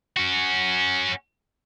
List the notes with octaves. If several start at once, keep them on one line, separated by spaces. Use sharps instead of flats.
C#4 F#4